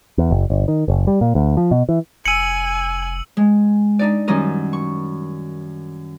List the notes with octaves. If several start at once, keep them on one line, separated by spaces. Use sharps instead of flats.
E2
F#1
G1
D#3
F#1
G3
A#2
D2
F3
B2
E3
F1 G#5 E6 C#7 D#7 F#7
G#3
D4 D#4 D5
F#2 D#3 G3 C#4 A#4 D#6
C#6